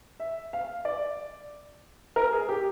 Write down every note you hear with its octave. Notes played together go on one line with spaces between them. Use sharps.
E5
F5
D5
A#4
G#4
G4